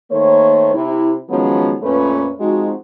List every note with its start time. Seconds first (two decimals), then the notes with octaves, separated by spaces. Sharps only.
0.10 D#3 A3 A#3 C5 C#5
0.73 C3 E4
1.30 D#3 F3 F#3 G#3 B3 C#4
1.82 F2 A#2 A3 C#4 B4
2.39 F3 G#3 C4 D#4 F#4